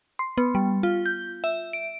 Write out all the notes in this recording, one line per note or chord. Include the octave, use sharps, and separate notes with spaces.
C6
B3
G3
F4
G6
E5
D7